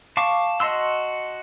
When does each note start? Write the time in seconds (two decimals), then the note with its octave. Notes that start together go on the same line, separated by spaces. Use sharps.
0.17 F5 A5 C#6 D6
0.60 F#4 D#5 A5 C6 E6